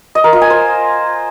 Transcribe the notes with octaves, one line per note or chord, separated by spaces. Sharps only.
D#5
A#4
F4
G#5
C5